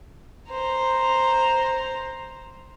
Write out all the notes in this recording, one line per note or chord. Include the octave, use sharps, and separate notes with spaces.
C5 A#5